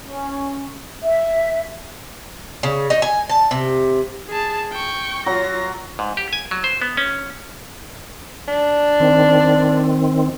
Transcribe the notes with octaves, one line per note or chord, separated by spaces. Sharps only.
C#4
E5
C#3
D#4
G#5
A5
C3
G#4 A5
G5 C#6
F#3 F4 A#6
G#2
G4
G#5
F#3
C5
B3
C#4
D4
D#3 C4